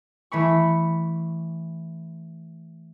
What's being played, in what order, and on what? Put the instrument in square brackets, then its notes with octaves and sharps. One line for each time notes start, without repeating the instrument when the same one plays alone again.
[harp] E3 A3 B5 C#6